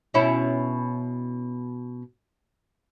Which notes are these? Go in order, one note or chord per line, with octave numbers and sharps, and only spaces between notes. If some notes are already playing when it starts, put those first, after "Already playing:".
B2 C#4 E4